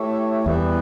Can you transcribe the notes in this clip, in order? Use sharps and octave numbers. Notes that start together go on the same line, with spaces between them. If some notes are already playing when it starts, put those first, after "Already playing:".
Already playing: A3 E4 G4 C#5
E2 E3 G3 B3